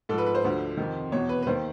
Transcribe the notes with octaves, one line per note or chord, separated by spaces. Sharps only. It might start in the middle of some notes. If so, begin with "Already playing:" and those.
G#2 F3 A4 B4
B4
C5
D2 D3 F3
F2 C3 D#3
E2 B2 C#5
B4
B4
D#2 D#3 C5